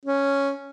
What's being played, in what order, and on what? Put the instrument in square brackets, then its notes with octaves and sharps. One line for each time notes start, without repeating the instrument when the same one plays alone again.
[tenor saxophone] C#4